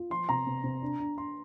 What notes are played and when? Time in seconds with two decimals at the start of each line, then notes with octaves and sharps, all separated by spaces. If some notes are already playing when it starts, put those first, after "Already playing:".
Already playing: F4
0.10 F3 C6
0.29 C3 A#5
0.47 C3
0.64 C3
0.82 D4
0.99 D4
1.17 D4 C6